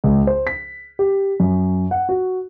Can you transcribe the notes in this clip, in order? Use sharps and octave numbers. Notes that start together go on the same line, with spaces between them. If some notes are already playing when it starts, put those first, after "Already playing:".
C#2
C5
B6
G4
F#2
F#5
F#4